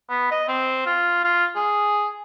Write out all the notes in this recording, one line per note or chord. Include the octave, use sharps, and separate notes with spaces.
B3
D#5
C4
F4
F4
G#4